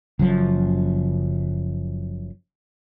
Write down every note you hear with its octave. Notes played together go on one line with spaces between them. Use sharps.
F#1 F#2 F3